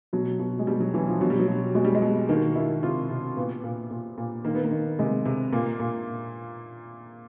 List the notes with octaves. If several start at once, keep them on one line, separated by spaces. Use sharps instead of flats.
B2 F#3
B2
G#3
B2 G3
F#3
B2 E3
F3
B2 F#3
G3
F#3
B2
B2 G#3
G3
G#3
B2
D#3 A#3
D#3 E4
C3 F4
C3
A#2 B3
A#2
A#2
A#2
D#3 A#3
B3
A#3
D#3
C3 G#3
C3
A#2 A#3
A#2